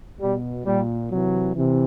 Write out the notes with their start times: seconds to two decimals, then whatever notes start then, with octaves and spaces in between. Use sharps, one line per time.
0.20 B2 G3
0.65 A#2 G3
1.10 C3 E3 F#3
1.54 C3 E3